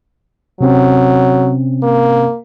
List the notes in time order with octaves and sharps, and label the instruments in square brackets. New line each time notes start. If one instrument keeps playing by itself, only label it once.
[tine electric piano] C3 C4 C#4 [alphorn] F#3
[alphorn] A#3